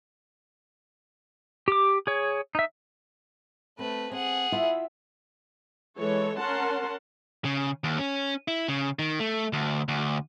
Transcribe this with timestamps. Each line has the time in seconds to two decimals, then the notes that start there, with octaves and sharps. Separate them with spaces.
1.68 G4 D6
2.07 G#4 C#5
2.55 D#4 E5
3.79 A3 C4 B4
4.11 C4 G#4 F#5
4.52 E4 F4 E5
5.98 E3 G#3 A4 C#5
6.38 C#4 A#4 F#5 A5 C6
7.45 C#3
7.84 D#2
7.98 C#4
8.48 E4
8.68 C#3
8.99 D#3
9.20 A3
9.53 D2
9.88 D2